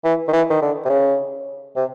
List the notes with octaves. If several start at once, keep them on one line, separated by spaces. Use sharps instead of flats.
E3
D#3
E3
D#3
D3
C3
C#3
C3